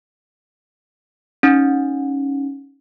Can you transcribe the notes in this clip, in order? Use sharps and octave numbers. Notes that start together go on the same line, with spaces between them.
C#4 D#4